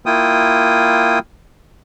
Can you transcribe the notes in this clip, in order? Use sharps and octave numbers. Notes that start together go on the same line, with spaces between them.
A#3 E4 F4 G5 D#6